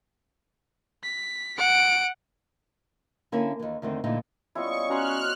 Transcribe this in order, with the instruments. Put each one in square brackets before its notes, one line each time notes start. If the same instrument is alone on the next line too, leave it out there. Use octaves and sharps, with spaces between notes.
[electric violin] B6
F#5 D7
[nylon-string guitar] D3 A#3 C#4 D4 E4
D#2 E3
E2 D3 D#3 A3 C4
A#2 D3 E3 A3 D#4
[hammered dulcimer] C#3 G3 B3 [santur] E4 F4 D#5 [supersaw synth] C#6
[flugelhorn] C#4 [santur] F#4 A#5 C6 [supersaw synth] F6 F#6